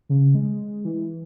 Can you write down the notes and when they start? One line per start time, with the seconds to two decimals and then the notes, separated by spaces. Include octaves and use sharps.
0.09 C#3
0.35 G#3
0.85 E3